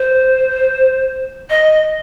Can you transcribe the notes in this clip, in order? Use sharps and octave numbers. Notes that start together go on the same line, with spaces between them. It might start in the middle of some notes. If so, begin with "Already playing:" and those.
Already playing: C5
D#5